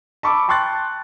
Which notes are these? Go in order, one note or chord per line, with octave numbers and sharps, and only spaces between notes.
A5 B5 C#6 D6 E6
G5 A5 C6 C#6 F#6 A6